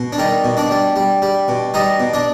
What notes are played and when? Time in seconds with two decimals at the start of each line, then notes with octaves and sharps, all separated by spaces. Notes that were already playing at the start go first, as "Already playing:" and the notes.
Already playing: B2
0.13 D4
0.18 D#3 G3 D#4
0.44 B2
0.57 D4 D5
0.71 G3
0.96 G3
1.22 G3
1.48 B2
1.74 G3 D#4 D#5
2.00 B2
2.14 D4 D5